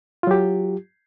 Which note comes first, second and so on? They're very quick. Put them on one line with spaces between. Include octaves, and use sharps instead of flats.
F4 F#3 G4